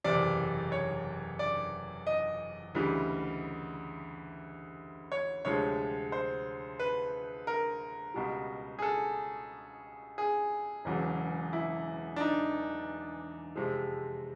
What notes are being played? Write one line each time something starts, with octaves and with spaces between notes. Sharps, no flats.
F#1 E2 C3 D5
C#5
D5
D#5
D2 C#3 E3 G3
C#5
D2 C3 F3 G#3 C#5
C5
B4
A#4
C#2 B2 G3
G#4
A4
G#4
E1 E2 C#3 F#3
E4
D4
D#4
F2 C3 F3 G#3